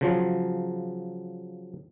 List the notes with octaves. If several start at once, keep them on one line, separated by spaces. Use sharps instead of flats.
C#3 F3 F#3